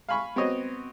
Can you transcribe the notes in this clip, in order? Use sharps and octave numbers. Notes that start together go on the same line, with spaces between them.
F5 G#5 B5 C#6
B3 C4 F#4 C#5 D#5